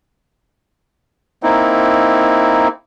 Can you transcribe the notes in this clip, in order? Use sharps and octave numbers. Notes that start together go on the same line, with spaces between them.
A#3 C4 D#4 E4